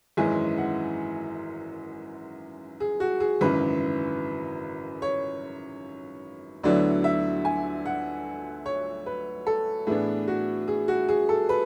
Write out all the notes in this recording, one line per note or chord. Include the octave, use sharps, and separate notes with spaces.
G#1 F#2 E3 G#3 C#4 G#5
F#5
G#4
F#4
G#4
G#1 F#2 C#3 E3 B4
C#5
D2 D3 F#3 B3 E4 D5
E5
G#5
F#5
C#5
B4
A4
A2 E3 B3 D4 G#4
F#4
G#4
F#4
G#4
A4
B4